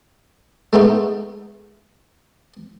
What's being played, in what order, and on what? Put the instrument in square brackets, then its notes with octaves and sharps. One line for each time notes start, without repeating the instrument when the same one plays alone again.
[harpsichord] G#3 A3 B3 D#4